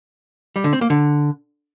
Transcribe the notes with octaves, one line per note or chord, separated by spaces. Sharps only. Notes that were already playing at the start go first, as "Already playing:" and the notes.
G3
D3
C4
A#3
D3